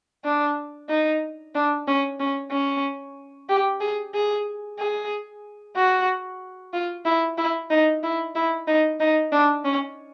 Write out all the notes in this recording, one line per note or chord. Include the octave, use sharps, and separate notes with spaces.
D4
D#4
D4
C#4
C#4
C#4
G4
G#4
G#4
G#4
F#4
F4
E4
E4
D#4
E4
E4
D#4
D#4
D4
C#4